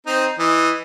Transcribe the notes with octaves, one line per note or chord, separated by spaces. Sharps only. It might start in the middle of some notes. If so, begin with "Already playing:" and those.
C4 D#4
E3 D#5